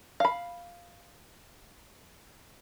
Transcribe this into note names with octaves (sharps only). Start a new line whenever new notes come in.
F5 B5